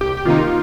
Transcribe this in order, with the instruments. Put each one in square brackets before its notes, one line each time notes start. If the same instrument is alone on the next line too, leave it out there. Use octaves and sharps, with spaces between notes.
[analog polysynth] C2 [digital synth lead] G4
[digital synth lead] G4
[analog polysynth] C3 D#3 A#3 D#4 [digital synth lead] F4